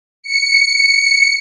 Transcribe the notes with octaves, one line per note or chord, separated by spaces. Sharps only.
C#7